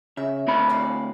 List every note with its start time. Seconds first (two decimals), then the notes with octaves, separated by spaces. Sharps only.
0.17 C#3 E5
0.47 D2 C4 B5
0.70 G#3 F4 D5